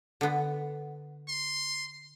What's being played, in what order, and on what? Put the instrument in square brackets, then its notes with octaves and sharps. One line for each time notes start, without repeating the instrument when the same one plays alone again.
[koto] D3 B3
[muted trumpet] C6